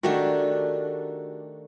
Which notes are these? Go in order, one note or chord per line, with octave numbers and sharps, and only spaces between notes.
D#3 A3 D4 F#4 G4